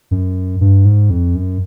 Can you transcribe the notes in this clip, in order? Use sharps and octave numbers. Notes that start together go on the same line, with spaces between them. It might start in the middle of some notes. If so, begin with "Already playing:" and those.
F#2
G2
G#2
F2
F#2